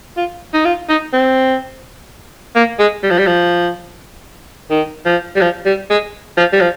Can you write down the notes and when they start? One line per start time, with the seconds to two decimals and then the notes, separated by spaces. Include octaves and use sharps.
0.17 F4
0.54 D#4
0.65 F4
0.89 D#4
1.13 C4
2.55 A#3
2.79 G#3
3.03 G3
3.11 F3
3.18 G3
3.27 F3
4.71 D#3
5.06 F3
5.36 G3
5.41 F3
5.66 G3
5.90 G#3
6.37 F3
6.53 G3
6.61 F3